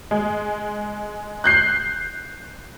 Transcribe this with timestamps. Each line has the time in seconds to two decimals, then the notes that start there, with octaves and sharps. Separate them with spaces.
0.11 G#3
1.44 F#6 G6 C7